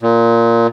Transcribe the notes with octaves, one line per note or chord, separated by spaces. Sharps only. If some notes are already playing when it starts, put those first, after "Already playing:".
A#2